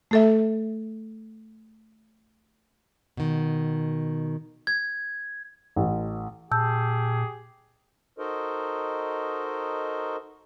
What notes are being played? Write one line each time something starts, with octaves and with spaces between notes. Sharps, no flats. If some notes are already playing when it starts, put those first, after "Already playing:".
A3 A4 E5
B2 D#3
G#6
A1
A#2 G4 G#4 A5 E6 G6
D#4 F#4 A4 A#4 C5 D#5